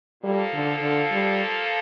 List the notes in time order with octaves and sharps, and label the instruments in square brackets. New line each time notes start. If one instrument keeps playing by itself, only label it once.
[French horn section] A#2 F3 A#3 F4 A4 [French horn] G3
[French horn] D3
D3
G3